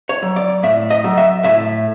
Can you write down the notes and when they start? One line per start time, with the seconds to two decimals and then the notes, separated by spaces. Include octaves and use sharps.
0.09 C#5
0.22 F#3
0.36 D5
0.63 A2 E5
0.90 D#5
1.04 F#3
1.17 E5
1.44 A2 E5